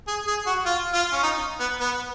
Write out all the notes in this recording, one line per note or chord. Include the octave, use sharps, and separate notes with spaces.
G#4
G#4
F#4
F4
F4
C#4
D#4
B3
B3